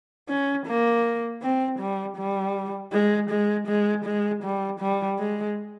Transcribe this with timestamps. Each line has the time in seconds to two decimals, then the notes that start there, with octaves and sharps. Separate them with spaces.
0.29 C#4
0.67 A#3
1.42 C4
1.79 G3
2.17 G3
2.93 G#3
3.30 G#3
3.68 G#3
4.05 G#3
4.43 G3
4.80 G3
5.19 G#3